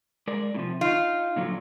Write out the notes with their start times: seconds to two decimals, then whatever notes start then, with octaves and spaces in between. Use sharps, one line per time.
0.27 G#3 A#4 D5
0.54 A2 C3 F3
0.81 D#4 F4
1.36 A#2 D3 F#3